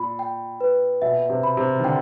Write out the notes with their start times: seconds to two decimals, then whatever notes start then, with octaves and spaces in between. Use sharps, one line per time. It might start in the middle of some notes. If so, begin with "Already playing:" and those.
Already playing: A#2 B5
0.19 G5
0.61 B4
1.02 B2 E5
1.30 C3
1.43 B5
1.57 C3
1.79 D#3
1.84 D3 G5